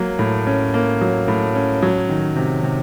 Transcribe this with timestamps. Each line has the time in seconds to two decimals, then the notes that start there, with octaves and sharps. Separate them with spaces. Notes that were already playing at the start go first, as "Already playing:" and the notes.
Already playing: F#3 A#3
0.19 A2
0.47 C#4
0.74 A#3
1.01 F#3
1.28 A2
1.55 C#4
1.82 F#3
2.09 D#3
2.36 C3
2.63 C3